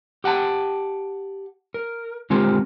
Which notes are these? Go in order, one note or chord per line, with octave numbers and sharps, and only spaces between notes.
G4 F#5 G5 A5
A#4
D3 G#3 C4 F4 G4 A#4